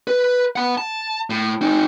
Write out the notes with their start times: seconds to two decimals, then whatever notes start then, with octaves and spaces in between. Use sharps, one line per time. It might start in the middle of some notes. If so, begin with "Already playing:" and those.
0.08 B4
0.56 F#5 B5
0.78 A5
1.30 A2
1.61 C4 D#4